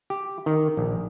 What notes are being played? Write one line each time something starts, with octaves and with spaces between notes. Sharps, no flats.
G4
D#3
A#1